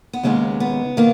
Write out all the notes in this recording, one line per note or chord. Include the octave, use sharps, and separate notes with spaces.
B3
D#2 C#3 G#3 B3 C#4
B3
D#3 A#3